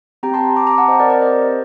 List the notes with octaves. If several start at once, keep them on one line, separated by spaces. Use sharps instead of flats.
C4 G4 G5 A#5
A5 C6
A#5 D6
A#5 D6
F#5 A5
C5 D#5
A#4 D5
A#4 D5
C5 D#5